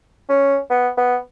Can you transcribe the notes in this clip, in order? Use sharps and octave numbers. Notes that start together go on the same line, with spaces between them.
C#4
B3
B3